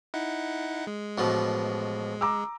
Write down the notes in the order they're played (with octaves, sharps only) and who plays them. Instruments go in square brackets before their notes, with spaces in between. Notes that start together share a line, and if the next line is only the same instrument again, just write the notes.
[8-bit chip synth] D#4 E4 F#5
G#3
[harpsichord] A1 B2 F3 [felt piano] F#4
[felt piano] A#5 D6 E6